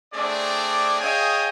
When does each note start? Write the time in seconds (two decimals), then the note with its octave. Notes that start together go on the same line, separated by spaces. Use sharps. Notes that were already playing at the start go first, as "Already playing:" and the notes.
0.13 A3 C4 D4 G#4 D5
1.00 G#4 C#5 D#5 F5 G5 G#5